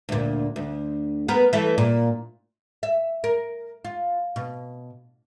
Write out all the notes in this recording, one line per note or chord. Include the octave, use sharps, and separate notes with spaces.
D2 A#2
D2
B3 A#4
E3 A3
A#2
E5
A#4
F4
B2